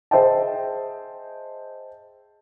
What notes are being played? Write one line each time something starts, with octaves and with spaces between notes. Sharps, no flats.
G#4 C5 D#5 E5 G5 A5